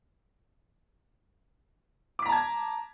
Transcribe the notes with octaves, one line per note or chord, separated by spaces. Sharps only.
A5 A#5 D6 G#6 B6